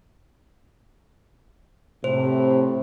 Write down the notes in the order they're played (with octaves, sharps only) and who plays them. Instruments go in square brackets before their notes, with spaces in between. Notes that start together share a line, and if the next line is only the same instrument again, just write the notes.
[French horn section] A2 C3 [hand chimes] C5